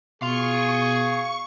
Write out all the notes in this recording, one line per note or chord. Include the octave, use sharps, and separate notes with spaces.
B2 G#4 F5 C6 C#6